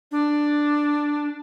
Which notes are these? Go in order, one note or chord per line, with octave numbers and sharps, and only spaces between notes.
D4